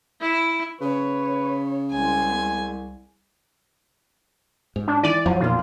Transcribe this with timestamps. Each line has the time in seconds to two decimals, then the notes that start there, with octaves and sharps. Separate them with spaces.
0.20 E4
0.81 C#3 B4 C#5
1.92 C2 G#3 C4 G#5
4.76 G#2
4.88 D4
5.03 E3 D5 D#7
5.26 F2 F3 F#3
5.40 B1 A#2 A#3 F4